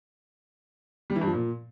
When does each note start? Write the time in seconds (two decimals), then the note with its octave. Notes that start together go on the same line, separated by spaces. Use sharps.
1.10 G3
1.16 E3
1.21 G2
1.27 F3
1.33 A#2